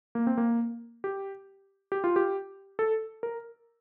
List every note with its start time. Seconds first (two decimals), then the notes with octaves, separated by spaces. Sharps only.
0.15 A#3
0.27 C4
0.37 A#3
1.04 G4
1.92 G4
2.04 F4
2.16 G4
2.79 A4
3.23 A#4